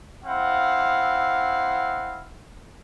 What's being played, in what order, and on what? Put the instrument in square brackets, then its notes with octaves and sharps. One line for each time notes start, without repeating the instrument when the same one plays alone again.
[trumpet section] C4 E4 F5 F#5